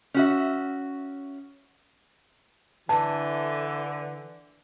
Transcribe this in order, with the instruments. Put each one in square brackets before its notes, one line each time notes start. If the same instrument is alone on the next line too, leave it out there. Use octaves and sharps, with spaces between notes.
[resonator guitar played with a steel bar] C#4 F#4 E5
[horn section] D3 E3 [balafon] A5